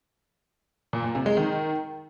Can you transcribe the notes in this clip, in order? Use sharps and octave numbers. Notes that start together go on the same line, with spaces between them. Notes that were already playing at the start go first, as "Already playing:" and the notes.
A#2
A#2
C3
G#3
D#3